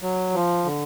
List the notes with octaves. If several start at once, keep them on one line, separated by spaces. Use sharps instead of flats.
F#3
F3
D3